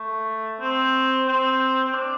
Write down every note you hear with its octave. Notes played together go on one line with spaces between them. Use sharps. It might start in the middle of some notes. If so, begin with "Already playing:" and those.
Already playing: A3
C4
C4
C4
D4